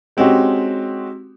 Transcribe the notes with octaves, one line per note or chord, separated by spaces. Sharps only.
G#3 C4 C#4 D#4 F#4 G4